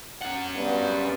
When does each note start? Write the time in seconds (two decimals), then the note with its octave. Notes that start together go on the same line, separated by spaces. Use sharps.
0.22 C#4 F#5
0.56 G2 B3